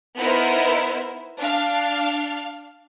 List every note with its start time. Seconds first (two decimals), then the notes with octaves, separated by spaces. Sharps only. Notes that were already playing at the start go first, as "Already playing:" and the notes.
0.17 B3 D#4 E4 A#4 C5
1.40 D4 F5